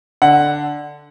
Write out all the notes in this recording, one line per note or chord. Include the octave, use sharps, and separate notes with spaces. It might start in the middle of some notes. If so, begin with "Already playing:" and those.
D3 F#5